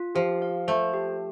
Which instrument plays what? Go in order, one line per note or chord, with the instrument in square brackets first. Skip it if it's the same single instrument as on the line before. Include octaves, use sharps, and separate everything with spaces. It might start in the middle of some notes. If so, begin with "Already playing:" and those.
Already playing: [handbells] F4
[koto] F3 [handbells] G4
[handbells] F5
[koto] A3 [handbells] C5
[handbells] G4